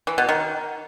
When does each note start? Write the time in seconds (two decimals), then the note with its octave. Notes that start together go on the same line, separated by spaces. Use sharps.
0.07 E3
0.18 B2
0.29 D#3